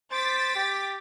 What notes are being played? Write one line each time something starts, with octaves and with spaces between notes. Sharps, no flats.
C5 D6 A6 B6
G4